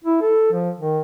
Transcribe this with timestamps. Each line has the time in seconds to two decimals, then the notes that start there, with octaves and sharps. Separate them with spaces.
0.04 E4
0.22 A4
0.53 F3
0.79 D#3